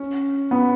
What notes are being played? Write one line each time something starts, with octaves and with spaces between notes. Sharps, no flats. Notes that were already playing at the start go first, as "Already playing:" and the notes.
Already playing: C#4
B3